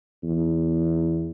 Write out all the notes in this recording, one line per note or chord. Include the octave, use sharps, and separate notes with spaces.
E2